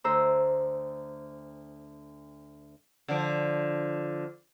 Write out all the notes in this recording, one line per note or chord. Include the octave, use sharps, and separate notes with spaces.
D2 C5 A#5 E6
D3 F3